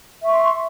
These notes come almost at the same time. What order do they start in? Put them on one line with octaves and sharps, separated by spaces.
E5 C#6 C6